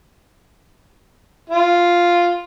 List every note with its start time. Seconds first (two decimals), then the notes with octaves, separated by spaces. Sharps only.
1.50 F4